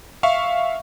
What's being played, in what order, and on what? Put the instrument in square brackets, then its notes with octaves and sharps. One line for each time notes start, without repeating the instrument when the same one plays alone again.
[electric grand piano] E5 F5 C#6